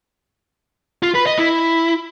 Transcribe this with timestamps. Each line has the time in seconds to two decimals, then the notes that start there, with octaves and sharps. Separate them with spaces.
1.03 F4
1.15 B4
1.27 D#5
1.39 E4